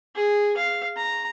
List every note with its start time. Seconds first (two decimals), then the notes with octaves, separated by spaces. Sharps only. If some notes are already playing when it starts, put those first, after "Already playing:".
0.15 G#4
0.57 F5
0.97 A#5